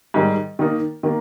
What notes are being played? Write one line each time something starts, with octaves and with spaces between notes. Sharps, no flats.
G#2 D#3 G3
D#3 A#3 D#4 A#4
D#3 A#3